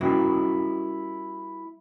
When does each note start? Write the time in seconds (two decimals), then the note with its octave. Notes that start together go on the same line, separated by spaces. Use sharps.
0.01 G3 A#3 C#4 E4 F#4